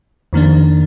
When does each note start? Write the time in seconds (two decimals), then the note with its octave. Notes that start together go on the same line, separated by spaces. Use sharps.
0.33 F2 D#3 A#3 D4